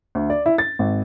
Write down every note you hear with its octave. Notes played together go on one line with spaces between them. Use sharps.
D2
D5
E4
A6
G#1